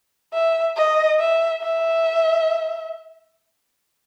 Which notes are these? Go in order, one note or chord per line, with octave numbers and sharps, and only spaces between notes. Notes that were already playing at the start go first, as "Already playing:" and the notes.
E5
D#5
E5
E5